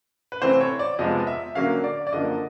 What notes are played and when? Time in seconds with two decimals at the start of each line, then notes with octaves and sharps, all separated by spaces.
0.32 B4
0.42 C3 E3 A3 C4 C5
0.61 C#5
0.79 D5
0.99 F2 C3 F3 G#3 B3 D#5
1.27 E5
1.55 D3 F#3 A#3 C#4 F5
1.84 D5
2.07 D5
2.12 F#2 D3 F3 A#3 D#5